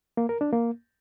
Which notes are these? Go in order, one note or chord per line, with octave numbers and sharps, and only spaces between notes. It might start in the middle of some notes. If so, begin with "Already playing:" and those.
A#3
A#4
D4
A#3